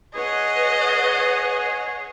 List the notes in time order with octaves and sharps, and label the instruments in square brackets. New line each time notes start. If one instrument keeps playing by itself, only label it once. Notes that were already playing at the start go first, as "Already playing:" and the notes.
[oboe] G#4 [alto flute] B4 [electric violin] C#5 F#5 [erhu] D#5